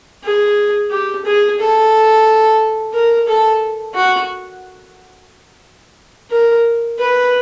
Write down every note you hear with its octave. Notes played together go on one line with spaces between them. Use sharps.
G#4
G4
G#4
A4
A#4
A4
F#4
A#4
B4